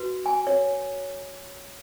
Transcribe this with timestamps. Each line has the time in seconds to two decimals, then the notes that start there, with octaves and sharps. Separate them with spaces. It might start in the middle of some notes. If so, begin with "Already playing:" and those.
Already playing: F#4 B4
0.26 G#5
0.47 C#5